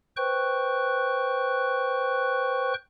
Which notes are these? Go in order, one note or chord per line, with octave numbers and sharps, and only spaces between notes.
B4 C5 G5 C#6 F#6